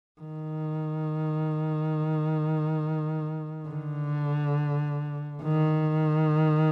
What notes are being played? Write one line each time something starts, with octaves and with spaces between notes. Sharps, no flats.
D#3
D3
D#3